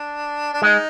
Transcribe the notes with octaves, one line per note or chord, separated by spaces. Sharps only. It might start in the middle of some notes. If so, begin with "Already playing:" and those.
Already playing: D4
D4
G#3 D#4